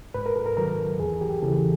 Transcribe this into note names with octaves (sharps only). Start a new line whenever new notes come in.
G#2 B4
A#4
A4
A#4
D#3 F#3 A#4
E2 G#4
G4
C#3 E3 A4